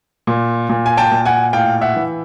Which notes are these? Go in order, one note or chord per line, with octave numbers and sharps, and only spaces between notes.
A#2
A#2
G#5
G5 A5
A#2
F#5 G#5
A2 F5 G5
E5 F#5
E3